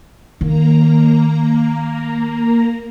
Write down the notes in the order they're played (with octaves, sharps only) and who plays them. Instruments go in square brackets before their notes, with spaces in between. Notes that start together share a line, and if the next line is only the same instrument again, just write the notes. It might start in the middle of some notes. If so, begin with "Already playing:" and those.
[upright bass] D#3 [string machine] A#3 A#5